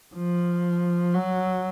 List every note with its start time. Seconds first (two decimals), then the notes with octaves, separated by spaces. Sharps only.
0.15 F3
1.14 F#3